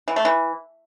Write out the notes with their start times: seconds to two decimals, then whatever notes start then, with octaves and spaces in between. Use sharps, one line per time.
0.08 E3
0.16 A3
0.25 E3